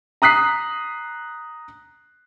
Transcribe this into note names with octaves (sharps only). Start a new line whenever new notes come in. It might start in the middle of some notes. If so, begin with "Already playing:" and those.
A#5 D#6 F#6 B6 C7